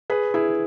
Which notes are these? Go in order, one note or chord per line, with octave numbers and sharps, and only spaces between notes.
G#4 B4
E4 G#4